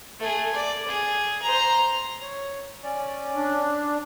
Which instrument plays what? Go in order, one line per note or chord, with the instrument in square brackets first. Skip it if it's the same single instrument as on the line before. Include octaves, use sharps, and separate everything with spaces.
[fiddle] A3 G#4
D5
G#4
C5 A#5
[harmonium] C#5
C#4 D5
[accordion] D4